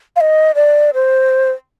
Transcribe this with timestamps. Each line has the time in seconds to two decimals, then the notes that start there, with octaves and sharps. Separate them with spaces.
0.16 F5
0.21 D#5
0.55 D5
0.94 C5